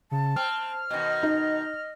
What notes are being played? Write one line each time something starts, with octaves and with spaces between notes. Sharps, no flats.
C#3 A5
C4 F6
B2 D#3 D#5
D#4